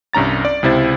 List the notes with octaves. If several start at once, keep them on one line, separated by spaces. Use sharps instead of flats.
C2 G2 C#4 A#5 A6
D5
C#2 C3 E4 C5 A6